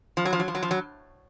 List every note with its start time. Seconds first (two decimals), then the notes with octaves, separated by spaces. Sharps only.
0.17 F3
0.25 F#3
0.33 F3
0.40 F#3
0.48 F3
0.55 F#3
0.63 F3
0.71 F#3